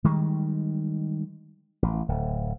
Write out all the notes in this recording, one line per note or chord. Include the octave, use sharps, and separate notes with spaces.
D#3 G3 G#3
A1
D1